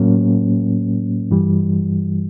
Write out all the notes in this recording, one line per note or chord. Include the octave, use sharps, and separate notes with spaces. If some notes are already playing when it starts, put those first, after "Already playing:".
Already playing: A2 F#3 A#3 C#4
G2 E3 G3